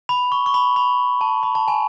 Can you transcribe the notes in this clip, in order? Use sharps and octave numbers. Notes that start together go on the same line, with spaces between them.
B5
C#6
C#6
B5
B5
A5
B5
A5
G#5